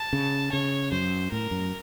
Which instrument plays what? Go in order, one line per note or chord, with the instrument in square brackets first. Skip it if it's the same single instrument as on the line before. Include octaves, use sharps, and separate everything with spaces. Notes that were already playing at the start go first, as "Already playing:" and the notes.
Already playing: [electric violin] A5
[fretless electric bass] C#3
[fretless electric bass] C#3 [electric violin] C#5
[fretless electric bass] F#2 [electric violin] C5
[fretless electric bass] A2 [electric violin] A#4
[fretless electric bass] F#2